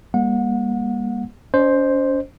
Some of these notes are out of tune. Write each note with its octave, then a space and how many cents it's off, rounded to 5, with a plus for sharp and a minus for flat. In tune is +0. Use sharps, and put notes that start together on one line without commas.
G3 +45 A#3 +30 F#5 -35
C#4 +35 C5 +5 D#5 -30